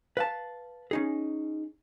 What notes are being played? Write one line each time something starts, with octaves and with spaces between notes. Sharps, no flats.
B4 F5 A5
C#4 D#4 G#4